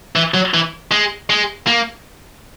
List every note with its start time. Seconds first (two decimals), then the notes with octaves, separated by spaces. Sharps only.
0.16 E3
0.34 F#3
0.54 E3
0.92 G#3
1.30 G#3
1.67 A#3